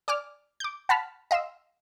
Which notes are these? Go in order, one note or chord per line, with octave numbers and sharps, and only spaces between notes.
D5 G#5 D6 F6
D6 G6
F#5 A5 B5 F6
D#5 F5 C6 E6